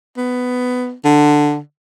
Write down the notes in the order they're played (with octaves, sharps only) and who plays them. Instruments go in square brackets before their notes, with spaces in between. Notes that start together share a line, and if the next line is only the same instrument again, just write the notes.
[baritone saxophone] B3
D3